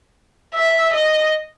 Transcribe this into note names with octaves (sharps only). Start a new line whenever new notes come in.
E5
D#5